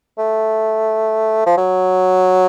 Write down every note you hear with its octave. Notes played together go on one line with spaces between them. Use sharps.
A3
F3
F#3